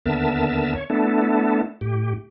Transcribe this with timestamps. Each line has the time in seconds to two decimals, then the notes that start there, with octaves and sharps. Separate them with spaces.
0.06 D#2 D3 B3 A#4 E5 A5
0.75 C#5
0.90 A3 B3 D4 E4 A4
1.81 A2 G4